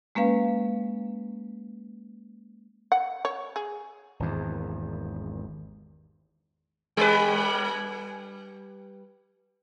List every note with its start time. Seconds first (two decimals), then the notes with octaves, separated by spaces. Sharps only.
0.15 G#3 A#3 C#4 B4 F5
2.92 F#5
3.25 C#5
3.56 G#4
4.20 G#1 E2
6.97 G3 B4